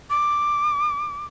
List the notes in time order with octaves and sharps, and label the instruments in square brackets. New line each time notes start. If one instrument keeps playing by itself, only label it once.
[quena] D6